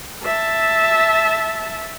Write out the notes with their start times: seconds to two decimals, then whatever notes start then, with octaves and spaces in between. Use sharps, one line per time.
0.24 E5 A5